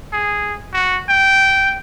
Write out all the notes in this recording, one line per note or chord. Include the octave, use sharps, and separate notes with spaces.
G#4
F#4
G5